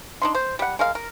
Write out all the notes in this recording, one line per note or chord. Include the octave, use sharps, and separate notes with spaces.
D4 D#4 C6
C5
G3 F#5
G#3 A#4 F5
A#4